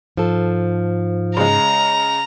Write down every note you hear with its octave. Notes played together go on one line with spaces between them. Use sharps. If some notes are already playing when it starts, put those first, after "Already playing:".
G#2 F3 A4
C#3 G#3 A#5